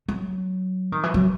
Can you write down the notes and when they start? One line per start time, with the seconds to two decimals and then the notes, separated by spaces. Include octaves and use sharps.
0.08 F#3
0.92 D#3
1.03 E3
1.14 F#3